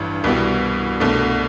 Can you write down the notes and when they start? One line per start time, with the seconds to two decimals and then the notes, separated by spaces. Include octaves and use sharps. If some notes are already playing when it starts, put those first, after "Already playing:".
Already playing: A1 G2 E3
0.24 C2 B2 G3 B3 E4
1.00 C2 B2 A3 D4